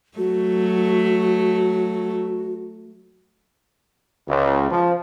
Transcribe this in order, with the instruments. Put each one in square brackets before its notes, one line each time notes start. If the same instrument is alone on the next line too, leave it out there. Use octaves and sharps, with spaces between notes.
[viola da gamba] F#3 A3 [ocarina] F#4
[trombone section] C#2
F3